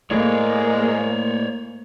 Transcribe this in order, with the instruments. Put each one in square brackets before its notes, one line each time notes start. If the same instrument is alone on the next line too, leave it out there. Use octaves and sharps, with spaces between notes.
[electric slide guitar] A2 [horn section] G#3 [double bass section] A#3 [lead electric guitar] C#5 D5